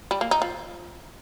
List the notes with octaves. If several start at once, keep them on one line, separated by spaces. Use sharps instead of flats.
G3
A#3
D#4
F3